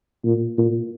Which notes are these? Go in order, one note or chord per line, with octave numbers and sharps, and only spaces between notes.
A#2
A#2